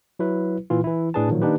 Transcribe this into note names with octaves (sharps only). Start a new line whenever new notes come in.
F#3 E4 B4
A#2 E3 F4
E3 E4
A2 D4 G#4 B4 A5
A#2 D#3 F3 F#3
D#3 A#3 D4 D#4 G4 B4